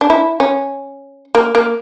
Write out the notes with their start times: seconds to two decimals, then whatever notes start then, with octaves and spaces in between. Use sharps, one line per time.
0.01 D4
0.10 E4
0.40 C#4
1.35 A#3
1.55 A#3